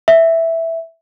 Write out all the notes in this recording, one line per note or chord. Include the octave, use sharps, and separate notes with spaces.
E5